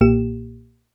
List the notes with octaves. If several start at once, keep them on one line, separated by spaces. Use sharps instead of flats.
B1 A#2 A#3 G4 E7